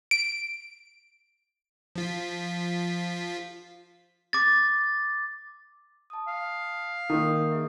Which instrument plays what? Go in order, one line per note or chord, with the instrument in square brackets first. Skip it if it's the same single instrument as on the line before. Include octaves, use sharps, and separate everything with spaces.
[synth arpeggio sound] D7
[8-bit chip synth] F3 F4 B6
[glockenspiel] D6 A6
[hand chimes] A5 D#6
[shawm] F5
[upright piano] D#3 [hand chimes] A#3 A#4 D#6
[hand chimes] G#4 E5